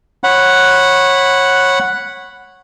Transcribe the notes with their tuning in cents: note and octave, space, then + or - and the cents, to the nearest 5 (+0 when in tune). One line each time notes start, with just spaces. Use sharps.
C#5 -20 F#5 +0 B5 +0